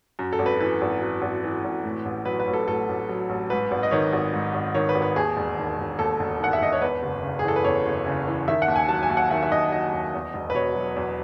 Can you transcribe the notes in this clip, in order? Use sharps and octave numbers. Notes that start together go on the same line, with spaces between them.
F#2
A4
G#1
B4
E3 B4
G#1
F#2
G#1
E3
G#1
A2
A1
F#3 B4
B4
A1
A4
A2 A4
A1
F#3
A1
G#2 B4
G#1
D#5
D#3 C#5
G#1
G#2
G#1
D#3 C#5
B4
G#1
B4
D#2 G#4
E1
D#3
E1
D#2 A4
E1
D#3 F#5
E5
E1 D#5
C#5
E2 B4
F#1
C#3
G#4
E3 A4
B4
E2 C#5
F#1
C#3
E3
D#3 E5
F#5
D#2
G#5
F#3 A5
G#5
D#2
F#5
D#3 E5
E5
D#2 D#5
F#3 D#5
D#2
E2
E1
B4
B2 C#5
F#3
E2